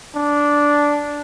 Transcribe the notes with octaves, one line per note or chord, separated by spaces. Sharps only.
D4